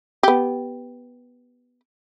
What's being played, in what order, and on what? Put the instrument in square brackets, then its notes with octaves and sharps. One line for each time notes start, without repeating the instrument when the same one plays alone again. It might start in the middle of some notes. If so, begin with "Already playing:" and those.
[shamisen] B3 G4